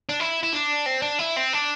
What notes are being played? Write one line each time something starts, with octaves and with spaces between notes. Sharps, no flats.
D4
E4
E4
D4
C4
D4
E4
C4
D4